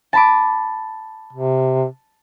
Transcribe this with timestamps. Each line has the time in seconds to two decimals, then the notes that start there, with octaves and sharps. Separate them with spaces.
0.13 A5 B5 D6
1.33 C3